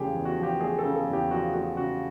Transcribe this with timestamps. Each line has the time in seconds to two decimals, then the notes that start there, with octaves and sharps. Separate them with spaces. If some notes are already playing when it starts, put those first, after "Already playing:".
Already playing: E2 C#3 F3 A3 G4 G#4
0.13 E2
0.25 F#4
0.37 F3
0.43 G4
0.60 A3 G#4
0.79 A4
0.84 C#3
0.96 A4
1.07 E2
1.13 G4
1.31 F3 F#4
1.54 A3 F#4
1.77 C#3 F#4